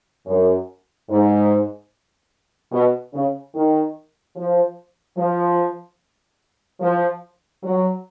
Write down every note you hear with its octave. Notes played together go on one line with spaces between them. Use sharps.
F#2
G#2
B2
C#3
D#3
F3
F3
F3
F#3